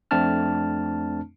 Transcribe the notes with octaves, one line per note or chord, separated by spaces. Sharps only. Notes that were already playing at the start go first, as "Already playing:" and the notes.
F2 A3 C4 D4 A5 F6